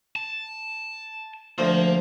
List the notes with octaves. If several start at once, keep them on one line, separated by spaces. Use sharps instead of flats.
A5
D2 F3 A#3